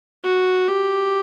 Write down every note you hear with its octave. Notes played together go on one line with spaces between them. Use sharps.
F#4
G4